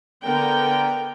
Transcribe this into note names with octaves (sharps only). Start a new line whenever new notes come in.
D3 B3 A#4 G5